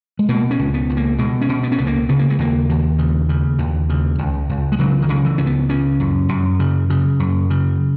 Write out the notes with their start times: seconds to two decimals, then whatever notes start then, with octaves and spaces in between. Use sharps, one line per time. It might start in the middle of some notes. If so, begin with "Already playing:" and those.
0.19 G#3
0.29 B2 A#3
0.51 C#4
0.59 C#2
0.74 B3
0.90 C#2
0.97 A#3
1.18 B2 G#3
1.41 C#4
1.49 B2
1.63 B3
1.72 C#4
1.78 C#2 B3
1.87 A#3
2.09 C#3 B3
2.19 A#3
2.30 G#3
2.39 D#2 A#3
2.69 D#2
2.98 C#3
3.29 C#3
3.59 D#2
3.89 C#3
4.19 C#2
4.49 C#2
4.72 G#3
4.79 C#3 F#3
5.02 D#3
5.09 C#3
5.25 E3
5.38 C#2 C#4
5.46 B3
5.69 C#3 C#4
6.00 F#2
6.29 F#2
6.60 C#3
6.90 C#3
7.20 F#2
7.50 C#3